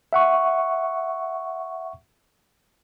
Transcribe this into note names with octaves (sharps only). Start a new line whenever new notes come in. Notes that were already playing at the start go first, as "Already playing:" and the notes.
E5 F#5 C#6